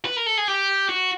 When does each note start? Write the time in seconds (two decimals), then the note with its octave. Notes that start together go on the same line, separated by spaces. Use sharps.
0.05 B4
0.16 A#4
0.26 A4
0.38 G#4
0.48 G4
0.89 F#4